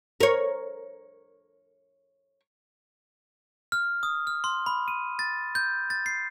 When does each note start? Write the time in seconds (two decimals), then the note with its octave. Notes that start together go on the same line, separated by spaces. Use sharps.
0.21 A#4 C#5
3.72 F6
4.03 D#6
4.27 F6
4.44 C6
4.66 B5
4.88 D#7
5.19 A6
5.55 G6
5.90 A6
6.06 C7